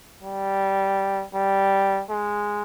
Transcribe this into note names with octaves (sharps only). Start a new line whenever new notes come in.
G3
G3
G#3